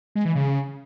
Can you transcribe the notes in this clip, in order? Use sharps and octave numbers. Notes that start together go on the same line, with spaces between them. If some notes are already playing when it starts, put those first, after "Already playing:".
G#3
E3
C#3